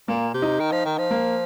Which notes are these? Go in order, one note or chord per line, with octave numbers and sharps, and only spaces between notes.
A#2 A#3
C3
D#4
D#3
F3
D#3
F3
A#3